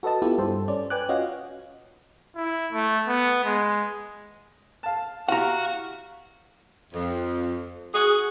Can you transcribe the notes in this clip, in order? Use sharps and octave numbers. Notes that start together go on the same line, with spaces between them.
F#4 A4 B4 D#5 A5
B3 E4 F4 G4 A4
G2 A4 C5
C#4 D5
B4 G5 G#5 D6 F#6
C#4 F4 F#4 D#5 F5
E4
A3
B3
G#3
F5 A5
E4 F#4 G4 F5 F#5 A#5
F2
F#4 G#4